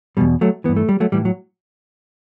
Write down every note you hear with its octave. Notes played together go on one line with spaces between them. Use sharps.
E2 B2 G3
F#3 A3
G2 E3 B3
A3
G3
F#3 A3
A2 E3 G3
F#3